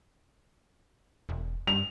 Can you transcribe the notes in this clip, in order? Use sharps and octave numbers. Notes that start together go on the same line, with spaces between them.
E1
G2 F7